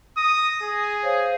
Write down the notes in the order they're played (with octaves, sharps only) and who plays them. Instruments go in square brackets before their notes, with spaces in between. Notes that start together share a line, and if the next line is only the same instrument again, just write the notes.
[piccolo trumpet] D#6 [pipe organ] A#6
[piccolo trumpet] G#4
[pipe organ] C5 C#5 F5